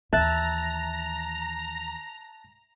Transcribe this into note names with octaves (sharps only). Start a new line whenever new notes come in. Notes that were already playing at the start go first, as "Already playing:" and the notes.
D#2 E3 E5 A5 A#5 F#6 A6